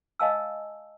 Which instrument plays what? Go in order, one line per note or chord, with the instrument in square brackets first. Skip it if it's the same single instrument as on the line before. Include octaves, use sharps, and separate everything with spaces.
[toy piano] D#5 F5 G#5 A5 E6